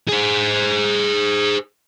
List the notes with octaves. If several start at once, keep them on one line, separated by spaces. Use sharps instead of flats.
G#4 C5